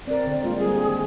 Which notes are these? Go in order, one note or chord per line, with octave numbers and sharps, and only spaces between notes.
C4 A#4 D5
D3
G#3 A#3 F4
G3 C4 G#4
D#3